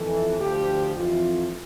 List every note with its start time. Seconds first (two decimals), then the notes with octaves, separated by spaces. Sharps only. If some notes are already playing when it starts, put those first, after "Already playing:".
Already playing: F2 E3 A4
0.39 D2 D3 F3 G4
0.94 F2 E3 F4